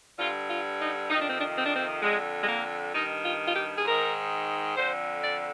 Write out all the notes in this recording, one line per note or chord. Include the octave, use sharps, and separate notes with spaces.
G2 D3 F4
F4
D#4
F2 C3 D#3 D#4
D4
C4
D4
C4
D4
C4
F2 D3 G#3
G#3
A#3
G2 D#3 D#4
F4
F4
G4
G#4
G#2 D#3 A#4
F2 D3 C5
D5